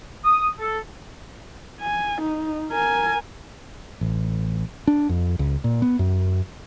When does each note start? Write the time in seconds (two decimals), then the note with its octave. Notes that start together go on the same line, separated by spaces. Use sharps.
0.24 D#6
0.59 A4
1.81 G#5
2.22 D#4
2.71 A#4 G#5
4.01 A1
4.87 D4
5.09 F2
5.39 C#2
5.64 A#2
5.82 B3
5.99 F#2